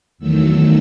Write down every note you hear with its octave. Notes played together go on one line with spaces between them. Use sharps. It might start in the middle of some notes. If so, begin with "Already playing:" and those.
E2 D#3 F#3 A3 E6